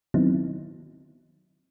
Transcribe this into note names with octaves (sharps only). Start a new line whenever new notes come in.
D#3 F#3 B3 C4 D#4 E4